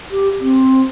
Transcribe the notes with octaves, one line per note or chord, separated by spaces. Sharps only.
G4
C4